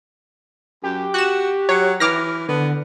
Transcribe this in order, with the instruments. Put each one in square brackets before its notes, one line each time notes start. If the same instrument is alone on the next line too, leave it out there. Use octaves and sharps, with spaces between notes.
[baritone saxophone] F#2 [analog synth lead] G4
[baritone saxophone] F#4 [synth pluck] F#6 E7
[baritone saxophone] F#3 [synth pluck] C#5
[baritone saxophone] E3 [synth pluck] D6 F6 A#6
[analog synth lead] D3 [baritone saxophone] B3